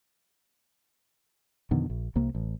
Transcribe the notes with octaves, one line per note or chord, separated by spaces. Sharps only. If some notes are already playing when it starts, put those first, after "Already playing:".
F2 B2 D3 D#3
A#1
C2 C3 A#3
A1